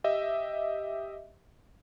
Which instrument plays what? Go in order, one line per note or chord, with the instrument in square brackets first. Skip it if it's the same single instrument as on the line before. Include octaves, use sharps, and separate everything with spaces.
[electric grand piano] G4 D#5 E5